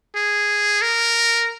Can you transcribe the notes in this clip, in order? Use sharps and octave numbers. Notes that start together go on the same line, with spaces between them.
G#4
A#4